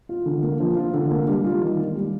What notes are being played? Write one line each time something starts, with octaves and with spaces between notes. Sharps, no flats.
F4
D3
A#3
F3
F4
D3
A#3
G3
F4
D#3
A#3
G3